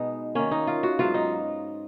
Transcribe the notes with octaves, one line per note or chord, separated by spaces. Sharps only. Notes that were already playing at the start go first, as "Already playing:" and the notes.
Already playing: B2 G#3 B3 D#4
D#3 A#3 C#4
D#4
F4
F#4
G#2 F#3 B3 F4
D#4